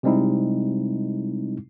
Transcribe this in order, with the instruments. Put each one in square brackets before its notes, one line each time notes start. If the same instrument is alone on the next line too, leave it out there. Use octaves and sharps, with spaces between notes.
[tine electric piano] C3 G3 G#3 C4 D#4 E4